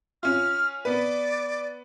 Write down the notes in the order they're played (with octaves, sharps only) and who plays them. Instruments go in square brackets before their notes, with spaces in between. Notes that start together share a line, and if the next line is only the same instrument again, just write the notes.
[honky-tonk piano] C#4 F4 [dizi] F6
[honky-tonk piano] B3 B4 [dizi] D5